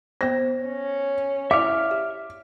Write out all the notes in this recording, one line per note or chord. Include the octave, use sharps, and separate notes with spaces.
B3 C5 A#6
C#4
E4 D5 E5 F5 D6 F6
G4